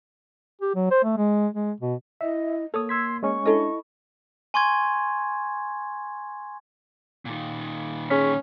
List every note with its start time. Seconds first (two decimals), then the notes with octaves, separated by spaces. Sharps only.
0.61 G4
0.75 F#3
0.91 C5
1.04 A3
1.17 G#3
1.53 G#3
1.80 B2
2.21 E4 D#5 E5
2.74 A#3 A4 C#5 D#6
2.89 C6 E6 G#6 B6
3.23 G#3 C#4 C#6
3.45 D4 E4 A4 D#5
4.54 G#5 C6 C#6 G#6
7.25 A#2 D#3
8.10 C#4 G#4 C#6 B6